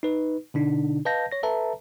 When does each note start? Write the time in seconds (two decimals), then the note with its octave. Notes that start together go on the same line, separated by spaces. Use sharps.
0.03 D#4 B4
0.54 B2 D3 D4 D#4
1.05 B4 D#5 F5 A5 G6 A#6
1.32 C#5 A#6
1.43 A4 B4 E5 A5 A#5